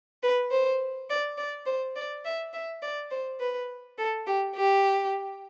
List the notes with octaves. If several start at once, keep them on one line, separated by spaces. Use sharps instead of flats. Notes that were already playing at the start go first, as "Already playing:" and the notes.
B4
C5
D5
D5
C5
D5
E5
E5
D5
C5
B4
A4
G4
G4